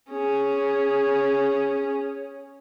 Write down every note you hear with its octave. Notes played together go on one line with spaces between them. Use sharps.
C#4 G#4